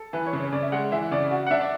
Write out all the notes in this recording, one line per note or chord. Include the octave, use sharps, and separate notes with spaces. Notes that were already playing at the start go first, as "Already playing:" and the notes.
Already playing: A4
E3 B4
C#5
C#3
C#5
C#3 D5
E5
G#3 F#5
E3 E5
C#3 D5
F#4
F#5
D4 E5
D5